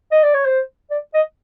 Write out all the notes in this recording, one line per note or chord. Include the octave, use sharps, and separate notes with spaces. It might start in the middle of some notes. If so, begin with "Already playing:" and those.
D#5
D5
C#5
C5
D5
D#5